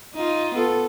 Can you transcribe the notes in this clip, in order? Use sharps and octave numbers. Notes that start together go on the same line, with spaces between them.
D#4 F4
B3 F4 A4